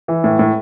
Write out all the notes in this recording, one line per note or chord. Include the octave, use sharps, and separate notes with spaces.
E3
A2
A2